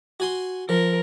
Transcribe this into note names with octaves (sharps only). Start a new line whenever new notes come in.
F#4 G#5 C6
F3 A#4